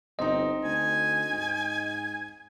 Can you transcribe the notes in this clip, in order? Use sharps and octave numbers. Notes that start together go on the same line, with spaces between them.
G1 C4 D#4 D#5
D2 G#5
G#2